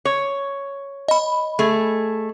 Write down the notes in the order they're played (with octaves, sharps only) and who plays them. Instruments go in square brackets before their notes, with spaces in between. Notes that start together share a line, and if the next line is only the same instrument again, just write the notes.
[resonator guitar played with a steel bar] C#5
[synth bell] D#5 B5
[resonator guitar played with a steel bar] A3 G#4